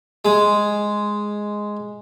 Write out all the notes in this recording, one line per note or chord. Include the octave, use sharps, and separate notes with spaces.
G#3